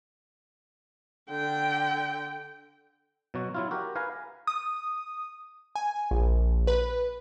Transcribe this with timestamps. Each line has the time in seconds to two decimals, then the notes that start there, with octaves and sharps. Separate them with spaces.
1.30 D3 G5
3.34 B2 F#3 F#4
3.55 F#3 E4 F4
3.71 F#4 G4 A#4
3.95 B4 F5 G#5 A#5
4.47 D#6
5.76 G#5
6.11 A#1
6.67 B4